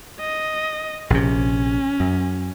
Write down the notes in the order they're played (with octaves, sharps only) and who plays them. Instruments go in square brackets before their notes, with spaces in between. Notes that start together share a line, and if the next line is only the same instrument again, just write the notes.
[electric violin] D#5
[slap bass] A#1 C3 [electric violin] C#4
[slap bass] F#2